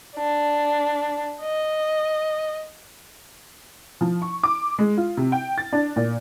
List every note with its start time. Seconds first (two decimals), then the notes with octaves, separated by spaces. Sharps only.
0.16 D4
1.41 D#5
4.01 F3
4.22 C#6
4.43 D6
4.79 G#3
4.97 F4
5.17 C3
5.32 G5
5.58 A6
5.73 D4
5.96 A#2